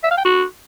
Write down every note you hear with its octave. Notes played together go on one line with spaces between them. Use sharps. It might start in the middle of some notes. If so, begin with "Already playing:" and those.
E5
F5
G5
F#4